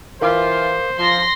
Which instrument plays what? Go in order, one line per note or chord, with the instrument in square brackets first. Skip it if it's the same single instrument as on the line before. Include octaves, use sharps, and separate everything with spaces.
[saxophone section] E3 F4 [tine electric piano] A#4 F5 D6 [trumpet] C5
[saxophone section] F3 [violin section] C6 A#6